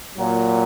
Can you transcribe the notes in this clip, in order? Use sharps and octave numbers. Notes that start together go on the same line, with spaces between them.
A#2 F#3